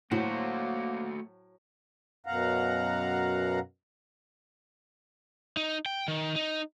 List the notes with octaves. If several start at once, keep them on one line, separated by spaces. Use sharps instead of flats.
A2 F#3 A3 A#3 F#4 C5
F#2 B2 F5 F#5 A#5
D#4
G5
D#3
D#4